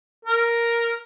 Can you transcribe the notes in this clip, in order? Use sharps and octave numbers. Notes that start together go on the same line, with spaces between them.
A#4